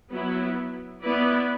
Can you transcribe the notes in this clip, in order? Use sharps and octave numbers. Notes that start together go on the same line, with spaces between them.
F#3 B3 E4
B3 E4 B4 D5